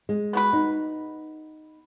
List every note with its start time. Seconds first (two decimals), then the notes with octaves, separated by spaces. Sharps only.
0.09 G#3
0.33 B3 F#4 B4
0.53 D#4